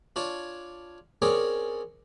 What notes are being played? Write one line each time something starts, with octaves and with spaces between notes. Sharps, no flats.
D4 F4 C#5 G#5 A5
C4 C#4 G#4 A#4 C#5 D5